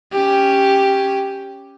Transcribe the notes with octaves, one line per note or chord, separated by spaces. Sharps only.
C#4 G4